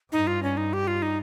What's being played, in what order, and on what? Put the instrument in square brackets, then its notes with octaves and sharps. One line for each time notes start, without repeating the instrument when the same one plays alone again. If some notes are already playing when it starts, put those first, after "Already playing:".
[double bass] G2 [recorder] D#4
[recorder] F4
C#4
D#4
G4
F4
D#4